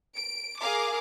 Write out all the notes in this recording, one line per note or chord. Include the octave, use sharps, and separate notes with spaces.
D7
G#4 A#4 F5 D6